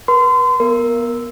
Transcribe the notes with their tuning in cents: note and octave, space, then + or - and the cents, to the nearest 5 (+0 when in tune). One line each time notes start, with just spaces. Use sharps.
B4 -40 C6 -35
B3 -20 A#4 +0